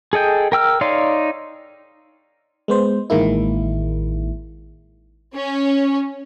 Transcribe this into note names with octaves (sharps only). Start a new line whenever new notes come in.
G#4 A4 D#5 G5
A#4 G5 E6 F6
D#4 C#5 D5 F5 C6
G#3 B3 C5
A1 D#3 G#3 A#3 E4
C#4